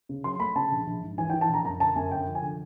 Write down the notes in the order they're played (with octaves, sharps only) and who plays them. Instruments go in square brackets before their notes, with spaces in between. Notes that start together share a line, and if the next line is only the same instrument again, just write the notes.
[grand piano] C#3
F#3 C6
A3 B5
C#3 A5
A#1
A#1
G#2
E3 G#5
G5
E3
A5
A#1 A#5
F#2 A#5
D3 A5
F#2 G#5
D3 G5
F3
G#5
D3